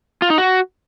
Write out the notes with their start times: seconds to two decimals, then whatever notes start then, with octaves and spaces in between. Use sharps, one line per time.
0.22 F4
0.30 D#4
0.38 F#4